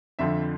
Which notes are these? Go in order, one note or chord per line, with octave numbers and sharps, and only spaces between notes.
F2 D3 F3 E5